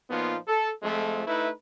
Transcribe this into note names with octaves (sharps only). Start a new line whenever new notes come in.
A#2 F3 B3 D#4 F4
A4
F2 F3 G#3 A3
A3 D#4 E4 B4